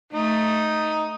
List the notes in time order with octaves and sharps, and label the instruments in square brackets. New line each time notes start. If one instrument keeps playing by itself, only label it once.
[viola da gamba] A3 [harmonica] D#4